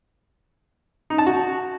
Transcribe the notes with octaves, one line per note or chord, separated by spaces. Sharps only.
D#4
A5
F#4